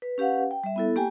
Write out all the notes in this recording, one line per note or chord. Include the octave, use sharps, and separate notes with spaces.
B4
C#4 G4 B4 F5 F#5
G5
G3 E5
B3 E4 A4
A#3 G4 G5 G#5